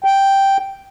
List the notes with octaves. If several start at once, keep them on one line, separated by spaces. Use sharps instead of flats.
G5